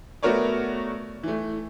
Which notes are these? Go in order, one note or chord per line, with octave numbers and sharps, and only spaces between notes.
A3 B3 F#4 A#4 C#5 D5
E3 A3